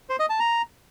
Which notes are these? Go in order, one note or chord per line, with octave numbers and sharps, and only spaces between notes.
C5
D#5
A5
A#5